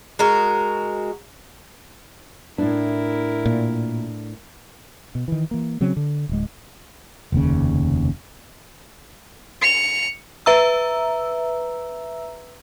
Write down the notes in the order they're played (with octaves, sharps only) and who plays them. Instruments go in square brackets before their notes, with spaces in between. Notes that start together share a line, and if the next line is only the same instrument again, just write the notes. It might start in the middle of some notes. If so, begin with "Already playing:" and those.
[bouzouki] G#3 F#4 A#4
[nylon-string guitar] A2 D4 [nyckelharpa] E4 A#4
[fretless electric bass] A#2
B2
D#3 E3
E3 A#3
C#3 F#3 C4 C#4
D3
D1 G#3
F1 D#2 C#3
[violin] C#7 F7
[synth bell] B4 E5 A#5 E6